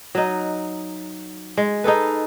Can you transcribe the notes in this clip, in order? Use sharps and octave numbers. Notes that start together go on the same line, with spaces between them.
F#3 D#4
G#3
D#4 G#4 A4 B4